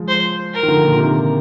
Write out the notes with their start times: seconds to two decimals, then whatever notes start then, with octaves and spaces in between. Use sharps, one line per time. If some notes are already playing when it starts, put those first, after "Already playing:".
Already playing: F3 G#3
0.08 C5
0.54 A#4
0.63 D#3
0.68 D3 F3
0.83 A#2 D3
0.98 C3 D#3